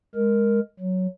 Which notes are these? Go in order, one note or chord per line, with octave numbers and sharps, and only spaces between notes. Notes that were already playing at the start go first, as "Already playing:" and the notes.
G#3 A#4
F#3